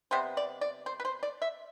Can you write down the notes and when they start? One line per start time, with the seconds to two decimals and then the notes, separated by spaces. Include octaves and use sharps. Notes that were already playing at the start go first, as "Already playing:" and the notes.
0.11 C3 G3 B3 C5
0.37 D5
0.61 D5
0.86 C5
1.00 B4
1.05 C5
1.23 D5
1.42 E5